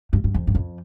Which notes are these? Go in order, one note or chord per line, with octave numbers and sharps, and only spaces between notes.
G2
G2
F2
G2
F2